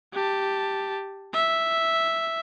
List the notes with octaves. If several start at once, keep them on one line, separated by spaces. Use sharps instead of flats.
G4 A5
E5